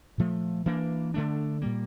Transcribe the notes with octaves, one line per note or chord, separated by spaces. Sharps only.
A#2 F3 A3
E3 A#3 D4
D3 A3 D4
A#2 G3 A#3